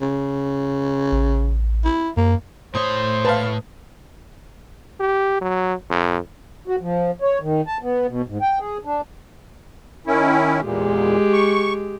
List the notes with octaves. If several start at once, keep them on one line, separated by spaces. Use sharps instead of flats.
C#3
A1
E4
F#2 A#3
A2 C5 C#5 D#6
B4 F5 A5
G4
F#3
F2
F#4
F3
C#5
D#3
A5
B3
B2
G#2
G5
G#4
D4
D#3 C#4 E4
E2 A#2 G#3 G4
C#6